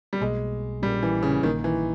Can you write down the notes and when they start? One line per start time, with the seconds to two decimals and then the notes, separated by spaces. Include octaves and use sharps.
0.13 G3
0.20 B1 B2 G#3 A#3
0.82 A#1 A#2 G3 G#3 C#4
1.03 E3
1.23 C#3
1.43 A#1 A#2 D#3 A#3
1.64 E3